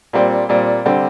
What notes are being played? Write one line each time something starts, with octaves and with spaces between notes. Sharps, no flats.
A#2 G3 C4
A#2 G3 C4
D3 G3 C4